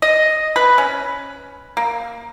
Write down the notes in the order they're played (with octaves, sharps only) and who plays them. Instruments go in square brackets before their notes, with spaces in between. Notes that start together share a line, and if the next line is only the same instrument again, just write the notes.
[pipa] D#5
B4
C#4
A#3